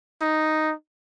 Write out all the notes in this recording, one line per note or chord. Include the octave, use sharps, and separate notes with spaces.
D#4